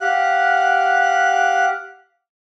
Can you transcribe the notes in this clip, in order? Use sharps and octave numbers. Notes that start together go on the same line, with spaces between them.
G4 F5 F#5 F#6